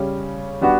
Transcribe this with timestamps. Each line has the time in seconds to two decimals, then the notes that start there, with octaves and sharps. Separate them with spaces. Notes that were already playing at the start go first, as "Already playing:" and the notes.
Already playing: C#3 G3 C#4
0.61 G3 B3 D4 F#4